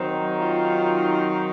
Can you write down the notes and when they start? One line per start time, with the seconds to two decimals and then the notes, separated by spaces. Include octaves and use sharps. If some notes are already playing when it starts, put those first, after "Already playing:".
Already playing: D#3 F#3 C4 D#4
0.39 F4